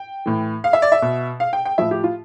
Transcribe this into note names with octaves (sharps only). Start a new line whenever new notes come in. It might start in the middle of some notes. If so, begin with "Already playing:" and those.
Already playing: G5
A2 E3
F5
E5
D5
E5
B2
F5
G5
G5
A2 F3 E5
G4
F4